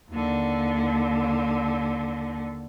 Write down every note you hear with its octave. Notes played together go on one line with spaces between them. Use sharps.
D#2 D3